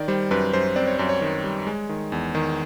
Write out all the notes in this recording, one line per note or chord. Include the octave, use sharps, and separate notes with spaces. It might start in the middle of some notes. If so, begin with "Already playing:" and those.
Already playing: D#3 D5
G3 C5
F#2 B4
F#2 C5
C4 D5
C#5
F#2 C5
C#5
D#3
G3
G#3
D#3
E2
D#3